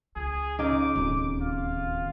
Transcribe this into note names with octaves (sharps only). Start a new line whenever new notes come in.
C#2 G#4
C#3 D#4 D6
D1 D#2
F4